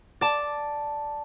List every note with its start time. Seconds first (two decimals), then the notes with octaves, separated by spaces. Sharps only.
0.21 D5 A5